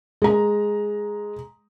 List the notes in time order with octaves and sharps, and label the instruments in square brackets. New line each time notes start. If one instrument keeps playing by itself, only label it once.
[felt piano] G#3 A#5